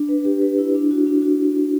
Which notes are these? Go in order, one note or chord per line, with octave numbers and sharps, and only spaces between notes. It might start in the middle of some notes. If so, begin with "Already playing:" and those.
Already playing: D4
B4
G4
B4
E4
D4
F#4
D4
F#4